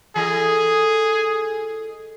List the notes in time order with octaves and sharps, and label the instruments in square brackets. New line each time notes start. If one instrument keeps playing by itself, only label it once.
[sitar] E3 A4 D#5 [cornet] G#4